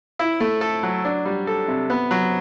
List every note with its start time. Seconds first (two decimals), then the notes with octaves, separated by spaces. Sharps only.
0.19 E4
0.40 A3
0.61 A4
0.83 F#3
1.05 D4
1.25 G3
1.47 A4
1.68 C3
1.90 B3
2.11 F#3